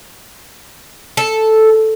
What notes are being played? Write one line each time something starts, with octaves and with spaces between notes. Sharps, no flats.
A4